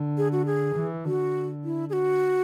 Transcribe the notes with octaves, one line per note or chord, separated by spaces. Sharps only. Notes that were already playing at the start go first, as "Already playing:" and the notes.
Already playing: D3
G#4
F#4
G#4
E3
D3 F#4
E4
G#4
F#4